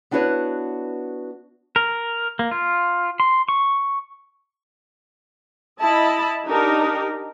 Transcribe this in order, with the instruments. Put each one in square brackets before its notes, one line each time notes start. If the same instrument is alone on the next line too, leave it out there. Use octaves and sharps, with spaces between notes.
[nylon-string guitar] B3 D4 E4 F#4 B4 C#5
[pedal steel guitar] A#4
A#3
F4
C6
C#6
[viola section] E4 D#5 A5 B5
D4 D#4 G4 A#4